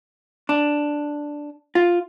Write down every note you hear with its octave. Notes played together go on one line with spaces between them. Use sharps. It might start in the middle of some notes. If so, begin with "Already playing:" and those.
D4
F4